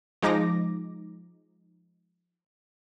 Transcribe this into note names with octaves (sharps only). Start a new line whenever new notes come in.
F3 G#3 D#4 D6 A#6